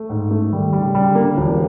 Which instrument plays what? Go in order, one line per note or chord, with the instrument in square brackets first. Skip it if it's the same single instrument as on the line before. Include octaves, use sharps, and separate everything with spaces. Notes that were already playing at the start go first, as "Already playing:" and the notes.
Already playing: [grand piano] A3
G#2
A3
[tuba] D#3 [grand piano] G3
[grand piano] G3
[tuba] C#3
[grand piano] G3
[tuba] D3
[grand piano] A#3
[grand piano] E1 [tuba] D3